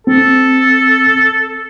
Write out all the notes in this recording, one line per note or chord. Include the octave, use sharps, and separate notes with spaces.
C4 A4